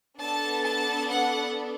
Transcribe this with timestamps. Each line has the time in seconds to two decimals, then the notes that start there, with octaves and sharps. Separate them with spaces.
0.21 B3 D4 A4 A5
0.66 A5
1.09 F#5